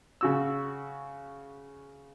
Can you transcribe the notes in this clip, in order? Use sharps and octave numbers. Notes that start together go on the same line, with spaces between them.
C#3 F#4 E6